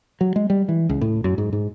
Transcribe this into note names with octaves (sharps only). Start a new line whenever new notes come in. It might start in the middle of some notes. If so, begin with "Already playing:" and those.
F#3
G#3
G3
E3
C#2
A2
F#2
G#2
G#2